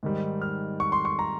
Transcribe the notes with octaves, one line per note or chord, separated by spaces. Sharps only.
G#2 D#3 G3
F6
C#6
C6
C#6
A#5